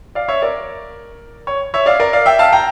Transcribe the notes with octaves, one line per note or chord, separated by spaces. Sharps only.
D5 F5
C#5 E5
A#4 D5
C#5
C#5 E5
D5 F5
A#4 D5
D5 F5
E5 G5
F5 A5
G5 A#5